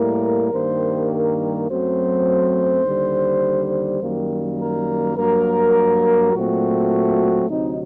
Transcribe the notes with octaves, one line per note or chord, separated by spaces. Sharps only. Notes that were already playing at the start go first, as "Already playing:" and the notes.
Already playing: A2 G3 A#3 A#4
G2 D#3 G3 A#3 C5
A#4
F#2 F#3 A3 C4 C5
D#2 D3 G3
F#2 D#3 G3 A#3
A#4
G2 F#3 A#3 A#4
A#2 F#3 A3 C4 F#4
D2 C3 F#3 C4 D#4